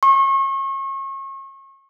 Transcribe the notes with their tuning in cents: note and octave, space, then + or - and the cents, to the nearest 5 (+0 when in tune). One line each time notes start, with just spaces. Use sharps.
C#6 -35